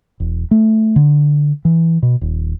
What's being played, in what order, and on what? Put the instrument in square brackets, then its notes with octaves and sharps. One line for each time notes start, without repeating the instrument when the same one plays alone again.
[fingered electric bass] E1
A3
D3
E3
B2
D#1